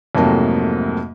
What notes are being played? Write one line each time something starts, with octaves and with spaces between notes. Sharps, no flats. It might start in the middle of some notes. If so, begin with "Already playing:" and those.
F2 G#2 C3 F#3 A3 A#3